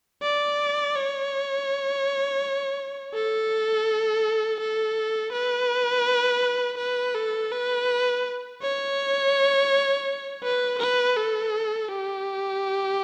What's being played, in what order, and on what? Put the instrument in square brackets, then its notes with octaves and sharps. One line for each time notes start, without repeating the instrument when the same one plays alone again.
[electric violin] D5
C#5
A4
A4
B4
B4
A4
B4
C#5
B4
B4
A4
G4